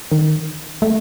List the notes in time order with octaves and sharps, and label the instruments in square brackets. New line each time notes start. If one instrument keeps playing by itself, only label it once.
[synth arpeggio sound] D#3
A3